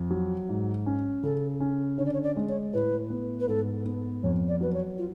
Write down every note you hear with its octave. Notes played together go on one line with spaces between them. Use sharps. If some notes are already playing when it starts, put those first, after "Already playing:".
Already playing: F2
F#3
G#2
C#4
C#3 A4
C#4
D3 C#5
D5
C#5
D5
G#3
C#5
A2 B4
B3
B4
G#2 A4
B3
F2 C#5
D5
F#3 B4
C#5
F4